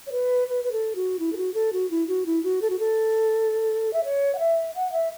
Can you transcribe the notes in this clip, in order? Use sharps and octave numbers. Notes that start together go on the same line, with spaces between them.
C#5
B4
B4
B4
A4
F#4
E4
A4
F#4
A4
F#4
E4
F#4
E4
F#4
A4
F#4
A4
E5
C#5
F#5
E5
F#5
E5